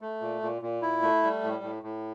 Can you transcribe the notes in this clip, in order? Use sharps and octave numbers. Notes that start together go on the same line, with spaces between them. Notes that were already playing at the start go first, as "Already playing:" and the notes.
A3
A#2
A#2
A#2
E4
A3
G3
A2
A2
A2